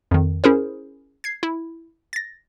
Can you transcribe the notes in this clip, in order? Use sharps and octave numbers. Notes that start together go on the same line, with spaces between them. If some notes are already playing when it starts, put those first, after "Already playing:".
F2 D#3
C#4 E4 G#4 A#4 C5
G#6 C7
E4
A6 A#6